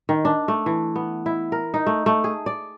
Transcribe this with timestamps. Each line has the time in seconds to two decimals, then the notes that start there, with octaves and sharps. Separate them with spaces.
0.09 D#3
0.25 D4
0.48 A3
0.66 E3
0.96 B3
1.26 E4
1.52 A#4
1.74 D#4
1.86 A3
2.06 A3
2.24 G#4
2.46 D5